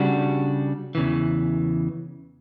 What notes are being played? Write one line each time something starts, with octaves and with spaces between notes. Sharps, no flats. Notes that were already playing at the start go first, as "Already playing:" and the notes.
Already playing: C#3 G3 D4 F#4
E2 C#3 E3